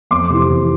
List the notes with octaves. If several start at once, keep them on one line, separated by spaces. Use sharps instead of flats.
F2 C6 D6
C3 E3
F2